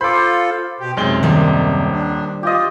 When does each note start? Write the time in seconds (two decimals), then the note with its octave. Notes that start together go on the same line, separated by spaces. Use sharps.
0.01 F4 A4 C5 B5 D6
0.80 B2 G4
0.97 B1 F#2 C3 G#3 G7
1.23 D#1 D#3 G3 A5
1.91 D4
2.43 F4 G4 D#5